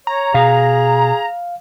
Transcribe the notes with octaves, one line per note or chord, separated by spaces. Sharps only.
C#5 A#5
B2 G#4 F5